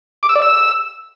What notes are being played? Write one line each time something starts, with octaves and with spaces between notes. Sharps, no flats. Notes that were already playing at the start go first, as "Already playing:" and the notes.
D6
E6
D5
E6